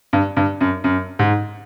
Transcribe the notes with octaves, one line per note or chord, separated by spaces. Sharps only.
G2
G2
F#2
F#2
G#2